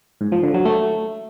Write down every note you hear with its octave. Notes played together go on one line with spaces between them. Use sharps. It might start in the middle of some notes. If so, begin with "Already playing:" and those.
G#2
F3
D3
F#3
A3